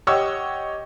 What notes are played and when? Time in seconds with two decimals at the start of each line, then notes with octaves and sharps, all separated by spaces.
0.07 G4 C#5 D#5 F#5 C#6 E6